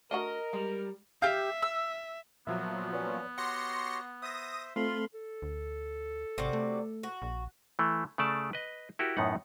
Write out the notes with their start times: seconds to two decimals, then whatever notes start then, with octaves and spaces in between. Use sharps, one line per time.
0.11 A3 D4 F#4 A#4 D#5
0.53 G3 G#3
1.22 G4 E5 F5 G6
1.62 E6
2.47 A#2 F3 F#3 B3 E5
2.93 C#4 B4 C#5 D5
3.38 F#4 G4 C#5 F#5 C6 A#6 C#7
4.22 C5 E5 D#6 A#6
4.76 A3 C4 F4 A4 F5 B5 C6
5.14 A4
5.42 D2
6.38 G#1 C3 F#4 D5
6.53 A3
7.03 F#4
7.22 A#1
7.79 E3 A3
8.18 C#3 A3 D5 A5
8.53 B4 D#5
8.99 E4 F#4 G4 A#4
9.17 F#2 A2 B3 D#4 F#5